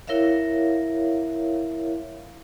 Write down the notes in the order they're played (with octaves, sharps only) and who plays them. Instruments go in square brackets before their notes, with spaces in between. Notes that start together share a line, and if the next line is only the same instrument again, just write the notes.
[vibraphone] E4 A#4 C#5 E5 F5